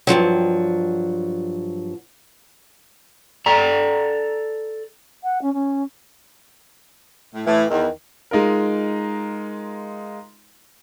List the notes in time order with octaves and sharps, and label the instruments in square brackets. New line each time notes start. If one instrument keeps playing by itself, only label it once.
[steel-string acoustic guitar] G2 B2 F3 F#3
[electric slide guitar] A4 D5 A#5
[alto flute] F#5
C#4
C#4
[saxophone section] A2
[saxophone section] A2 [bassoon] E3
[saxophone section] E2 [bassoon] D#3
[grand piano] G#3 D#4 F4 A#4